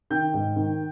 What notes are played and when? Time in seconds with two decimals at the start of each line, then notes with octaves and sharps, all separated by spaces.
0.10 D#3 G5 G6
0.34 G#2
0.56 D#3